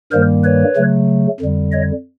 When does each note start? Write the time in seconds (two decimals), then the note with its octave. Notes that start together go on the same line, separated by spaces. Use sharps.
0.12 G2 D#3 G3 A#3 A#4 C5
0.44 B4 C#5
0.76 C#3 F#3 A3
1.40 F2 D3 G3
1.72 C#5 D#5